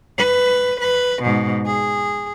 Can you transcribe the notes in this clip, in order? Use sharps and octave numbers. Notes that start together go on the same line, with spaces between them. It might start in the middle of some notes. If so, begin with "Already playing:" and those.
B4
B4
G#2 B2
G#4